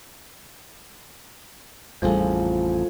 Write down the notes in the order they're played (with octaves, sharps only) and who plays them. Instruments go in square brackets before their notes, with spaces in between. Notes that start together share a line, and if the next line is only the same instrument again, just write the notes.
[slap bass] A1 F2 [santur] F3 A3 G#4 [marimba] G3